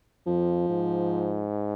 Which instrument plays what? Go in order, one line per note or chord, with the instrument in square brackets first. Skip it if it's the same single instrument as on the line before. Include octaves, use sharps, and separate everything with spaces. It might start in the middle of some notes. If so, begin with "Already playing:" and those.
[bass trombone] F2 [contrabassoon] F3
[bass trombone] G#2